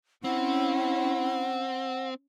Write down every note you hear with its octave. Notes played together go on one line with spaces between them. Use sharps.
C4 C#4 E4 F#5